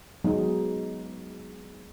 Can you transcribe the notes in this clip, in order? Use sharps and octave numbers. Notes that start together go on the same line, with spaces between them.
F#3 G#3 B3 D#4